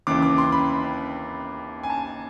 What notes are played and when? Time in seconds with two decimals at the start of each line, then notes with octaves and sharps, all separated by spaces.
0.07 D#2 C#3 E3 D6
0.22 D6
0.38 C6
0.52 B5
1.83 G#5
1.90 A5